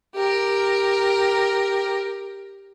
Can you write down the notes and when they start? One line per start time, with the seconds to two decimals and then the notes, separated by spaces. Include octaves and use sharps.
0.15 G4 A#4